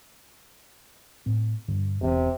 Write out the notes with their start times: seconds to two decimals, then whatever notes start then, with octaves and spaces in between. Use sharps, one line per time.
1.26 A2 C4
1.68 G2 D3
2.02 E1 C3 E3 C#4